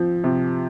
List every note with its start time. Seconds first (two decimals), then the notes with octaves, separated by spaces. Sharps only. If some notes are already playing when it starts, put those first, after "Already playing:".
Already playing: F3 C4
0.24 C3